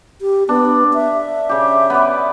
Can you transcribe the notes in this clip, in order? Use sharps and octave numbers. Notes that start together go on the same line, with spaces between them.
G4
B3 D4
E5
C#3 G4
B3 D5